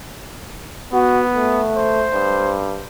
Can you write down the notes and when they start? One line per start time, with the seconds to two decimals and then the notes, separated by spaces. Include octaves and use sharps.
0.94 B3 F#4
1.36 A3
1.77 C5
2.14 G2